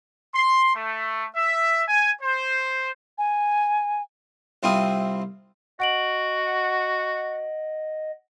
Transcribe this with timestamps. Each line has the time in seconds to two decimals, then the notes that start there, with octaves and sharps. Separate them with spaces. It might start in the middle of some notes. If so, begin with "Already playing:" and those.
0.34 C6
0.75 A3
1.36 E5
1.88 G#5
2.22 C5
3.18 G#5
4.63 C2 C4 E4 F4 D#6
5.80 F#4 D#5 F#5 D7 F#7